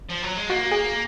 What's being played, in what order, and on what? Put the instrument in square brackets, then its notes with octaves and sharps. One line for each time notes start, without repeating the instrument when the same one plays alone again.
[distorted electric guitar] F3
F#3
G#3
[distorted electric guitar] A#3 [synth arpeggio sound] F#4
[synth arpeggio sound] G#4